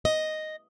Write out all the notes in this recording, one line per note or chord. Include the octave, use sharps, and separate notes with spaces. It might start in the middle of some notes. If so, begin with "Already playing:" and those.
D#5